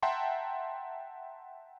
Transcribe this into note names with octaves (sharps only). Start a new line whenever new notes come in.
E5 F#5 G5 A5 A#5 C6